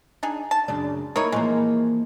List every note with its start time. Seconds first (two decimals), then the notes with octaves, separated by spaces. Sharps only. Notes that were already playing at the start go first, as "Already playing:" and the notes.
0.23 D4 D#4 G#4
0.51 A5
0.68 F#2 C#3 D4
1.16 A#3 D#4 E4 A#4 B4 C#5
1.32 E3 F3 G#3 A#3